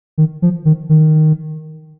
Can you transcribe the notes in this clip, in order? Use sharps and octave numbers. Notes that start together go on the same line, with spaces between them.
D#3
F3
D#3
D#3